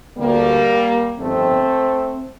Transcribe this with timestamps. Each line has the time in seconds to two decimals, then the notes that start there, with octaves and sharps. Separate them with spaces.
0.17 D2 D3 G3 A#3
1.18 G1 F2 D#3 A3 C4